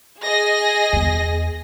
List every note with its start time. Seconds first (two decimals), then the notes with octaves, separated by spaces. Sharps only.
0.24 G#4 D#5 A#6
0.93 E2 B3